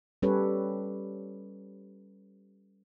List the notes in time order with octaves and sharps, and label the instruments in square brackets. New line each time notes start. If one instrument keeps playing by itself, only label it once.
[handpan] G3 C#4 G4 A4 B4 C#5